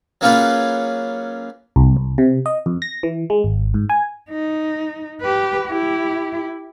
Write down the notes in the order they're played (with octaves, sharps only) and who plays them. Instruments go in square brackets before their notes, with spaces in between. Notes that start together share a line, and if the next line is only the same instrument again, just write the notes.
[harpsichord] F#3 A#3 C#4 F4 G#4 B4
[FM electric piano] C2
C2
C3
D#5
F2
A#6
E3
G#3
G#1
G#2
G#5
[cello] D#4
G4 B4
E4 G4